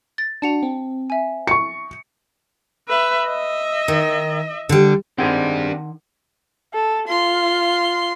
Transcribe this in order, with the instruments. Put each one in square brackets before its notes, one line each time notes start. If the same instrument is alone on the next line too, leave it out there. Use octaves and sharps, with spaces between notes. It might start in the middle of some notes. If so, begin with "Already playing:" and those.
[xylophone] A6
[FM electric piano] D4 F#4 [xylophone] A5 C#7 F7
[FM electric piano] C4 [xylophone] G5
[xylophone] E5 G#5
[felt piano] C#6 C#7
[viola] B4 E5
D#5 E5
[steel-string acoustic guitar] D#3
D3 G3
[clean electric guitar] D#3 F#5 [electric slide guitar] C4 G#4 A#4 [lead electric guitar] D4 G4
[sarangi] A4
[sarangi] F4 [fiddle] C6